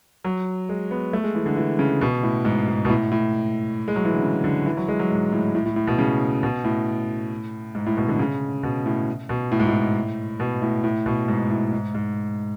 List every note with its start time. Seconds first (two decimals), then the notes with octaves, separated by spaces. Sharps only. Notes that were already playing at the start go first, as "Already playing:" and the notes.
0.24 F#3
0.69 G#3
0.91 B3
1.13 A3
1.24 G#3
1.35 E3
1.46 D3
1.57 E3
1.79 C#3
2.01 B2
2.23 A2
2.45 G#2
2.68 G#2
2.85 B2
2.89 A2
3.12 A2
3.88 G#3
3.96 F#3
4.05 E3
4.13 D3
4.22 C#3
4.44 D3
4.66 E3
4.77 F#3
4.88 G#3
4.99 F#3
5.11 G#2
5.33 A2
5.55 A2
5.65 A2
5.76 A2
5.87 B2
5.98 C#3
6.43 B2
6.64 A2
7.75 G#2
7.86 A2
7.97 B2
8.08 D3
8.19 C#3
8.63 B2
8.86 A2
9.29 B2
9.52 A2
9.60 G#2
9.67 A2
10.40 B2
10.62 A2
10.84 A2
11.06 B2
11.28 G#2
11.50 A2
11.72 G#2
11.95 G#2